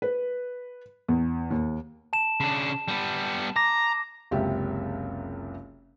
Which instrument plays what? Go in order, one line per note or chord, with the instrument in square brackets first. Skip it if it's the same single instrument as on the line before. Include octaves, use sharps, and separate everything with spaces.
[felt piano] B4
E2
D#2
[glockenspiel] A5 E7
[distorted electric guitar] C#3 D4
G3 B3
[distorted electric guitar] A#5 [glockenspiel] D6 A#6
[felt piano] F#1 C#2 C3 G4 E5